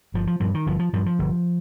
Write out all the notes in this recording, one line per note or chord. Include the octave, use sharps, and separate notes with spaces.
G1 F3
F3
G2 F3
D#3
G1 F3
F3
G2 F3
F3
G1